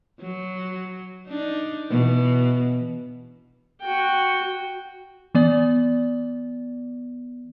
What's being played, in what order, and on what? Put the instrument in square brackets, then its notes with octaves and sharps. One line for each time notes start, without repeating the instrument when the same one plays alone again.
[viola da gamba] F#3
D4 D#4
B2 E3
[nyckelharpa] F#4 G5
[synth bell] E3 B3 D5